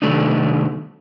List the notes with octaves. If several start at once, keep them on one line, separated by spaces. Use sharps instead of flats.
C3 D#3 F#3 A3 D4 D#4